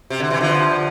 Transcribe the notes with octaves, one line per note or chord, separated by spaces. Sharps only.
C3
D3
C3 E3
D3 F3